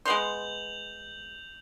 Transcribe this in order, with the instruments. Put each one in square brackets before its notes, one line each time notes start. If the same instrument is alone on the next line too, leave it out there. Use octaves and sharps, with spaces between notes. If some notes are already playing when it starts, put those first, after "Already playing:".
[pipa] G#3 B3 C6 [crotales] G6 F7 F#7